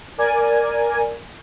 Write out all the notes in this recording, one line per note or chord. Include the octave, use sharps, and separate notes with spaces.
A#4 D5 G#5